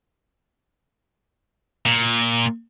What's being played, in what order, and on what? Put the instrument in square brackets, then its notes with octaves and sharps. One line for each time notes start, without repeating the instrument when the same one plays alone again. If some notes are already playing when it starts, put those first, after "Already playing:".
[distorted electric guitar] A#2